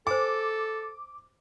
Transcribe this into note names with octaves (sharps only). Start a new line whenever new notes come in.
A4 C5 G#5 D6